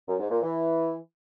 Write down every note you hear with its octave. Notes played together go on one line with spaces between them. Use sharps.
F#2
G#2
A#2
E3